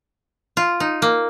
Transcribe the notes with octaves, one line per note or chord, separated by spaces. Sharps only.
F4
D#4
A#3